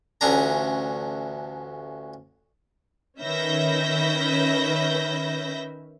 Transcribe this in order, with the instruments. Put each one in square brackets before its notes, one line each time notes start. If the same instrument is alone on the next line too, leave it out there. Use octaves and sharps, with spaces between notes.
[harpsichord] A1 D2 C#4 D4 A#5
[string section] D#3 C#4 B4 E5 G6 A#6